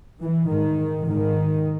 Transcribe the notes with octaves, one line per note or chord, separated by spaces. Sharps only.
E3
G#2 D#3
G#2 D#3